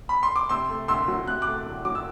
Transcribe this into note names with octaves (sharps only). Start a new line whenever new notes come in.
B5
C6
D6
C3 C6 E6
A3
D2 C6 E6
F#3
C3 F#6
D6 F#6
A3
E2
F#3 D6
E6